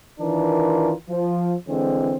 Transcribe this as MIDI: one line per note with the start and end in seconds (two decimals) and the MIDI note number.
0.20 0.93 51
0.20 0.93 52
0.20 0.93 62
0.20 0.93 65
0.20 0.93 70
1.09 1.55 53
1.68 2.17 50
1.68 2.17 52
1.68 2.17 56
1.68 2.17 60